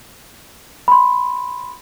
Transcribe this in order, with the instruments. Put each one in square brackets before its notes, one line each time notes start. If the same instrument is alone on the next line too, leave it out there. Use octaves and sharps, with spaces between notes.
[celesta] B5 C6